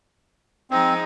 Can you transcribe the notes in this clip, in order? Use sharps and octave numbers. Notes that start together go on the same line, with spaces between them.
F3 G#3 C4 D#4